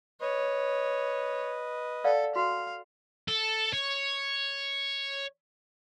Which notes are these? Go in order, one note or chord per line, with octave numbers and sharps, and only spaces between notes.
B4 C#5 D#5
A4 D5 F5 F#5
F#4 F5 C6
A4
C#5